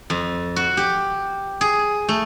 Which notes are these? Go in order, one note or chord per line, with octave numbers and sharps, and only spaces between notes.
F2
F#4
G4
G#4
A3